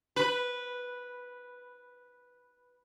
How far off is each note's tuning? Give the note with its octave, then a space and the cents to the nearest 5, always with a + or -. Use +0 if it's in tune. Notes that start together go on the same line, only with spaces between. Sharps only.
B4 -5